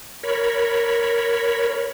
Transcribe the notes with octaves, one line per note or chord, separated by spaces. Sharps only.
A#4 C#5 B5